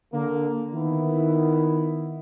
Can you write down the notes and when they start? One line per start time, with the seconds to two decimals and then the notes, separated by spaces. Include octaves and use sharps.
0.13 D3 A#3
0.74 D#3 B3 E4